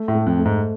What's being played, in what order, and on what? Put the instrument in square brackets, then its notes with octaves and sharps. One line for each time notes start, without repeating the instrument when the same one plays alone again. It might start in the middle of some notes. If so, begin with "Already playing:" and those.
Already playing: [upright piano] A3
[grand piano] A2
[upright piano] A3
[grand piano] F2
[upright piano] A3
[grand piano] G#2